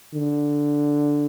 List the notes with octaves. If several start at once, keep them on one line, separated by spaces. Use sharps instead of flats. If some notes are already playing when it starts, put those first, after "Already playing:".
D3